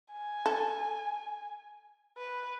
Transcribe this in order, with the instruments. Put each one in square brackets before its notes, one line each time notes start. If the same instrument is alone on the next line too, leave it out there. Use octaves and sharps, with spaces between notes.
[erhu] G#5
[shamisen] A4
[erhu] B4